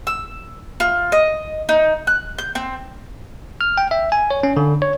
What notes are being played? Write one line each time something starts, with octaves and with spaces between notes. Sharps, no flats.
E6
F4
D#5
D#4
F#6
G6
C4
F6
G5
E5
G#5
C#5
C#4
D3
C#5